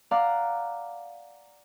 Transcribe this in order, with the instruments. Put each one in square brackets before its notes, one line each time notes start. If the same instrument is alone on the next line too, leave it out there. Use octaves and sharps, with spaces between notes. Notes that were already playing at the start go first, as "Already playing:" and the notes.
[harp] D5 F5 F#5 A#5 D6